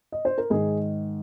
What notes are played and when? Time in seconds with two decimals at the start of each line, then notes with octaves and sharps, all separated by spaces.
0.12 D#5
0.25 C5
0.38 A#4
0.50 G#2 D#3 G#4